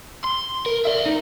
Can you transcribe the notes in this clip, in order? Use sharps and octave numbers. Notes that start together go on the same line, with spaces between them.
C6
A#4
D5 E5
D#4